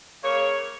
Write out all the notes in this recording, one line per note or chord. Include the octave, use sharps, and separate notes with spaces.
C#3 A#3 C#5